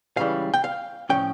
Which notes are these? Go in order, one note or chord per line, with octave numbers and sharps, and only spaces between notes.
C#2 C#3 E3 G3 F5
G5
F5
A2 F3 C#4 G5